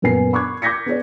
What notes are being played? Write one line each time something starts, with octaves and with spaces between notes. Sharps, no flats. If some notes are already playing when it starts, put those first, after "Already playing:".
F#2 A#2 B3 A#4 G#5 C7
B5 C#6 D6 F#6 G#6
D6 G6 G#6 A#6 B6 C#7
B3 G#4 C#5 D5